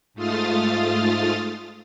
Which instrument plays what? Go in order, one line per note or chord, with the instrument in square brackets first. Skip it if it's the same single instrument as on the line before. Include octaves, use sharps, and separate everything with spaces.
[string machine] G#2 A3 F4 D#6 F6 A6